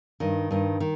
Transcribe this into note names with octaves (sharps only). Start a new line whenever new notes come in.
G2 D#3
G2 D#3
D#3